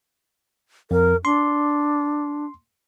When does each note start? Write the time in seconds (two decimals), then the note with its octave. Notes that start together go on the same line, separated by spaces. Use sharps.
0.91 F2 A#4
1.25 D4 C6